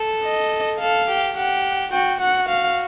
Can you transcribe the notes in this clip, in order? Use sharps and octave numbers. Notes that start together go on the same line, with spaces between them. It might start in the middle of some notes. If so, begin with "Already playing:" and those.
Already playing: A4
D#5
A4 F5
G4
G4 F#5
F#4 G5
F#4 F#5
F5